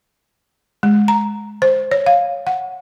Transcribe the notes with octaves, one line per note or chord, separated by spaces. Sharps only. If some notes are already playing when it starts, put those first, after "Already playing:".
G#3
A#5
C5
C#5
F5
F#5